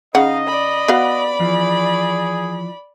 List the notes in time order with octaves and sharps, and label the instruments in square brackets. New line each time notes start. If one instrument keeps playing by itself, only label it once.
[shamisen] C#3 F#5 [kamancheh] D#4 F5 [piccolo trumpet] D#5
[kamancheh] D5 B5
[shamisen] B3 F#4 F5
[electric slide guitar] E3 F3 [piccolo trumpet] G#4